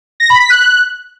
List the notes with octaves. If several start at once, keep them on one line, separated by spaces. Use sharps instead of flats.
A#6
B5
B6
F#6